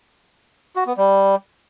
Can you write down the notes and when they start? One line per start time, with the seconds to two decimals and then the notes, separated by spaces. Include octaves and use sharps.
0.76 F#4
0.87 B3
0.97 G3